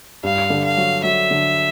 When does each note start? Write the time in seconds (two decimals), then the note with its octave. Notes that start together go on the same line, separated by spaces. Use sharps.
0.23 G2 F5
0.50 D3
0.64 F5
0.77 F#3
1.03 F#3 E5
1.31 D3